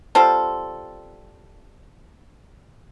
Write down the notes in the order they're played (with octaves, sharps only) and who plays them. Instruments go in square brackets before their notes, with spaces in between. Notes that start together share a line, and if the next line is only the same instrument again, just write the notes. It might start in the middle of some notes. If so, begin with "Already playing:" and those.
[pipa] G3 C4 F4 A4